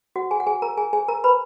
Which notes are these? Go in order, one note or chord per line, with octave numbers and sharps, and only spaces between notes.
F#4 F#5
G#4 G#5
F#5
G#4 G#5
A#4 A#5
G#4 G#5
G#4 G#5
A#4 A#5
B4 B5